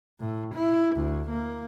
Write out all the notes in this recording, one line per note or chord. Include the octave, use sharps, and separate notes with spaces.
A2
E4
D2
A#3